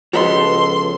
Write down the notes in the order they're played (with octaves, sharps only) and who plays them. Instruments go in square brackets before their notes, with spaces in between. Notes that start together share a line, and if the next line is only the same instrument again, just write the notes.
[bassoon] C#2 [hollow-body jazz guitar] F3 B3 A4 [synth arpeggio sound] F#4 D#5 [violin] C6